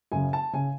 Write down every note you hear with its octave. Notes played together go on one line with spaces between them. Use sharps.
F#2 C#3 G#5
A5
C#3 G#5